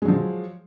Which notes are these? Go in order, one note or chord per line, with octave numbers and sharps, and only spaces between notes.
F3 F#3 G#3